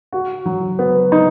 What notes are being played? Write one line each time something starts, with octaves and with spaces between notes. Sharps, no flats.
F#4
F#3
B3
D#4